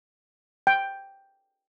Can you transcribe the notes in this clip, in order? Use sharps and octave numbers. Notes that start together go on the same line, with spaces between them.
G5